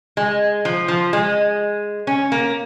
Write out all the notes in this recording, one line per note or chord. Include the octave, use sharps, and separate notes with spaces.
G#3
F3
F3
G#3
C#4
A#3